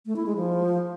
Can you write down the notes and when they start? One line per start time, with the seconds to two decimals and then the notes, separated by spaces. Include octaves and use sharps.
0.06 A3
0.16 E4
0.26 G#3
0.36 F3